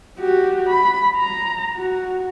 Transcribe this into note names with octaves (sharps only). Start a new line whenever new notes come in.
F#4 G4
B5
A#5
F#4